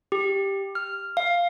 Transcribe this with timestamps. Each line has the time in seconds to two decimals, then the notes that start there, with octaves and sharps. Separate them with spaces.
0.12 G4
0.75 F6
1.17 F5